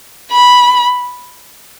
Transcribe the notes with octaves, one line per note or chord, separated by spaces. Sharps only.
B5